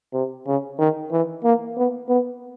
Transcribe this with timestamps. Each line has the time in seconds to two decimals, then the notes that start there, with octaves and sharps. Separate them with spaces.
0.14 C3
0.47 C#3
0.79 D#3
1.11 E3
1.44 A#3
1.77 B3
2.08 B3